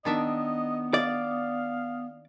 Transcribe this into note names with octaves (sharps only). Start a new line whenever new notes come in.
D#3 B3 D4 D#5 E5
D5 F5